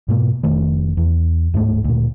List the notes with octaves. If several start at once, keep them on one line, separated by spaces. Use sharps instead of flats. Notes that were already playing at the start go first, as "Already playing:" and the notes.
G#2 B2 A#3
F1 D#3 A3
E2
D1 G#2 A3
D2 A#2